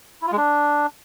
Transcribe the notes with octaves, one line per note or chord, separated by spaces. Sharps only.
E4
F4
G#3
D4